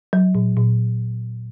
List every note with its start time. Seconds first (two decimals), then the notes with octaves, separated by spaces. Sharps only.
0.13 F#3
0.35 A#2
0.57 A#2